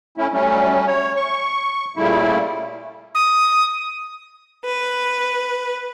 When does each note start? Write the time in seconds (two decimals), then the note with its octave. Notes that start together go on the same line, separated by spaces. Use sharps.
0.18 A3 C#4 E4
0.32 F#3 G3 A3 C#4
0.87 C#5
1.16 C#6
1.97 A#2 C#3 G3 A3 E4
3.15 D#6
4.65 B4